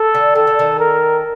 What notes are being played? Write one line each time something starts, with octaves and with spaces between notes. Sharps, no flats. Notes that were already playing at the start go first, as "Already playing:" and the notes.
Already playing: A4
D3
D#3 A4
D3
D#3
A#4